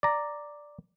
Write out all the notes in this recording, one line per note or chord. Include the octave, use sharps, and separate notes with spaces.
D5 A#5